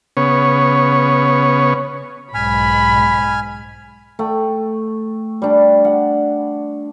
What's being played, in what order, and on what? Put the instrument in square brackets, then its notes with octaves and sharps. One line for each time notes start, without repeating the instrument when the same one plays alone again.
[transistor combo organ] C#3 B3 C#5
[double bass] B1 G#2 [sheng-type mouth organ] G#5 F6 [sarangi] B5 [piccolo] B6
[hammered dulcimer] A3 G5
G3 D4
F#5